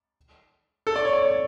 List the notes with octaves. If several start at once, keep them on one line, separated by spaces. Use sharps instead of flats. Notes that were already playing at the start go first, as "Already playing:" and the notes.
A4
D5
C#5
D5
C#5